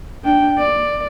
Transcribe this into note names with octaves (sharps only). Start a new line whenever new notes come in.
D4 G5
D5